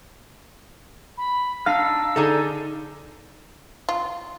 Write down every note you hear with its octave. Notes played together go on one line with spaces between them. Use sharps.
B5
D4 D#4 F5 E6 F6
D3 D#4 G#4 A4 D5
F4